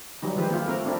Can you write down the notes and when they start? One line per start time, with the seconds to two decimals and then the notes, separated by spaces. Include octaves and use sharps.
0.22 E3 F#3 G3 D#4
0.37 D#3 F3 G#3 G4 B4 C5
0.50 A#3 E4 F4
0.67 A3 C4 A#4
0.85 A3 C4 D4 E4 A#4